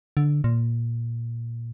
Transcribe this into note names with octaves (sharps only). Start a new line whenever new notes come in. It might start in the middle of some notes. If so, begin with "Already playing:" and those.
D3
A#2